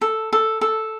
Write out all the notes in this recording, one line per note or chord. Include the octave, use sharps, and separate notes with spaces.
A4
A4
A4